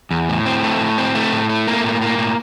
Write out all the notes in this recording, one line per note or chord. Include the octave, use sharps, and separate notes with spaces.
E2
A2
C4
A3
A2
C4
A3
A2
A3
A#3
A2
A#3
A2